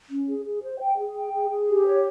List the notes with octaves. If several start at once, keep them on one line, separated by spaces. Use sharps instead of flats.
C#4
G#4
G#4
C5
G5
G#4
G5
G#4
G#4
G4
C#5